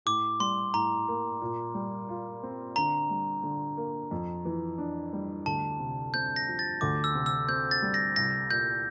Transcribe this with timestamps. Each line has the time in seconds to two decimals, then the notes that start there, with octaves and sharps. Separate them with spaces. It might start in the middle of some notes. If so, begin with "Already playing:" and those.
0.06 A2 D6
0.40 G3 C6
0.73 A2 A#5
1.08 A#3
1.42 A#2
1.74 G3
2.09 F4
2.43 C4
2.76 D3 A#5
3.10 G3
3.43 D3
3.77 A#3
4.11 F2
4.45 E3
4.78 D4
5.13 G3
5.46 D2 A5
5.79 C3
6.14 C4 G6
6.36 A#6
6.47 F3
6.59 A6
6.81 D2 D6
7.04 E6
7.15 C3
7.26 E6
7.48 C4 G6
7.71 A6
7.82 G3
7.94 A#6
8.16 C2 A#6
8.50 A#2 G6